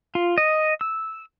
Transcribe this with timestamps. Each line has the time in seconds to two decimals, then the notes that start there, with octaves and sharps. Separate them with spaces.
0.15 F4
0.38 D#5
0.81 E6